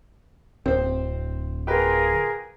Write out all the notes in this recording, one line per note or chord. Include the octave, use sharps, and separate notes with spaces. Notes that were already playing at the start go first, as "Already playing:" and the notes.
D1 C4 C5
F4 G4 G#4 A#4 B4